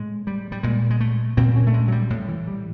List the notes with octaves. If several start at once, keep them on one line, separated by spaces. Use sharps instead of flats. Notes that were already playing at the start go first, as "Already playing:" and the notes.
Already playing: A2 G#3
G3
G3
A#2 G#3
G#3
A3
A#2 C4
C#4
A3
G#3
F#3
G3
A2
E3
G3